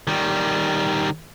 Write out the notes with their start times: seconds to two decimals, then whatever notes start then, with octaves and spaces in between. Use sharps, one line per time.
0.07 D#3 G3